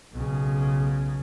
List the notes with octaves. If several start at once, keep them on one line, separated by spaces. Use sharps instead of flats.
B1 C#3